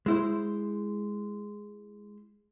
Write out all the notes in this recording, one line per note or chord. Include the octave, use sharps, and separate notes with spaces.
G#3 E4 C5